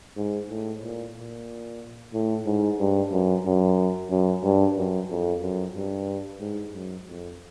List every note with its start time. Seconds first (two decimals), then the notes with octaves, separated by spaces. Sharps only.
0.16 G#2
0.49 A2
0.82 A#2
1.15 A#2
2.13 A2
2.46 G#2
2.79 G2
3.12 F#2
3.45 F#2
4.10 F#2
4.44 G2
4.77 F#2
5.10 F2
5.42 F#2
5.74 G2
6.40 G#2
6.73 F#2
7.06 F2